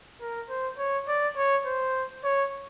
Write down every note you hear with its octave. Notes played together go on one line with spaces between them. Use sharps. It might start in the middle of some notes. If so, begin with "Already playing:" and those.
A#4
C5
C#5
D5
C#5
C5
C#5